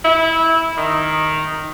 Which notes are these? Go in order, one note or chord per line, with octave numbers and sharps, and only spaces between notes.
E4
D#3